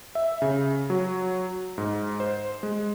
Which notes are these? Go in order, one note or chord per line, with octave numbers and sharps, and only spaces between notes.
E5
C#3
F#3
G#2
C5
G#3